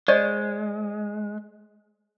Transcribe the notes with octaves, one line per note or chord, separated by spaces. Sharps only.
G#3 C5 D5 D#5